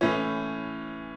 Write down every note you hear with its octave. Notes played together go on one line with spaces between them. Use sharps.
A2 E3 C#4